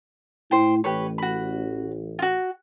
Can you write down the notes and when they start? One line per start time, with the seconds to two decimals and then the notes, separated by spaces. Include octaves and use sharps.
0.51 A2 E4 C5 G5
0.84 A1 G4 B4 C#5
1.18 F#4 B5
2.19 F4 F#4